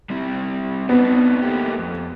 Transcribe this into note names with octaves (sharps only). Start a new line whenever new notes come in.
G3 C4 E4
B3 C4 D4 D#4
A3 A#3 G4
F2